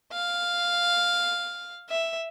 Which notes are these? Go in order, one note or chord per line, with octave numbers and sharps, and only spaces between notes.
F5
E5